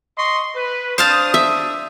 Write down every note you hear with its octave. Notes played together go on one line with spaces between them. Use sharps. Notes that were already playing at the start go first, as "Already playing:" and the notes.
D#5 C6 C#6
B4
D4 C5 F5 A5 D#6
E5